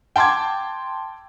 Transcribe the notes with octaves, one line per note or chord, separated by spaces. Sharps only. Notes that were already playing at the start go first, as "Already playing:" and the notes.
G5 A5 C6 D6 G#6